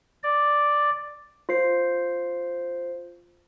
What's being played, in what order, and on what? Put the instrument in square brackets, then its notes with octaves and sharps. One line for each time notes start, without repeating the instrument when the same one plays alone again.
[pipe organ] D5
[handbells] F4 C5 C7